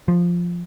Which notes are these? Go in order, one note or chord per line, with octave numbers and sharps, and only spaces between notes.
F3